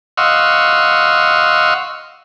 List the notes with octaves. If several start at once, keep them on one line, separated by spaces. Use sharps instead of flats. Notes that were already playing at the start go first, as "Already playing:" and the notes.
D#5 F5 F#5 C6 C#6 E6